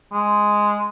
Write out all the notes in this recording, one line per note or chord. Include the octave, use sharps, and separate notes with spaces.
G#3